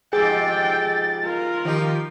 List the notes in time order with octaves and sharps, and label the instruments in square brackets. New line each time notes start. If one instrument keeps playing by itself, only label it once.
[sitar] F2 G#2 C3 [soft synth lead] G#4 [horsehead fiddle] G5 [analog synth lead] A6
[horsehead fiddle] F4 A#4
[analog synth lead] D#3 [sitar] F3 D#4 G4